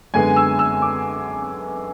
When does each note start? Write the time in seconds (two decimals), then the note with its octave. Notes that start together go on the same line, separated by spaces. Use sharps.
0.14 F#2 D3 G#3 B3 G#5
0.36 E6
0.59 E6
0.82 D6